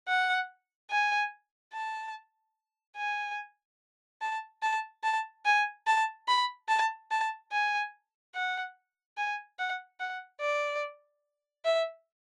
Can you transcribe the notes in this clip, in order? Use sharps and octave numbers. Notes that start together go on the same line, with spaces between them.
F#5
G#5
A5
G#5
A5
A5
A5
G#5
A5
B5
A5
A5
G#5
F#5
G#5
F#5
F#5
D5
E5